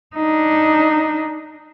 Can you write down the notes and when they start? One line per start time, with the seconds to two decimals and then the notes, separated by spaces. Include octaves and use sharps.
0.15 D4 D#4